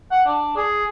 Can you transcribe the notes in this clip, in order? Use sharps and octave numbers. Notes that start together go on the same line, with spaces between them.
F#5
D4
G#4